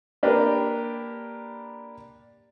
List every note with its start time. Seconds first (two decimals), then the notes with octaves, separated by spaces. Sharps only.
0.23 A#3 D4 G4 A#4 B4